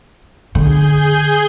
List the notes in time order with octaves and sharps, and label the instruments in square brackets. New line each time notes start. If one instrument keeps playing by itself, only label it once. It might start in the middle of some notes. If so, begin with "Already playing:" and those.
[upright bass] D3 [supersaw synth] G#4 G6